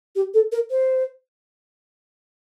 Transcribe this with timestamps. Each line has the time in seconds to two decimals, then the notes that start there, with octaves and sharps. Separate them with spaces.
0.16 G4
0.34 A4
0.52 A#4
0.71 C5